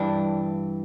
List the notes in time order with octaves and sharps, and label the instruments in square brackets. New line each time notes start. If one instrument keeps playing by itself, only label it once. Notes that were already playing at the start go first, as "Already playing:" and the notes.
Already playing: [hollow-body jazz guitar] G2 E3 D4